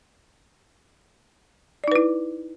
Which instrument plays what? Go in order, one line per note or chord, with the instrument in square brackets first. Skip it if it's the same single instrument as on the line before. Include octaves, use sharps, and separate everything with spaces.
[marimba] D5
D#4
B4
E4